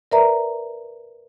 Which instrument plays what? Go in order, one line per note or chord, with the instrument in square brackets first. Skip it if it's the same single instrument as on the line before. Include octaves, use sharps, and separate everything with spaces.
[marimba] A#4 B4 D5 E5 A#5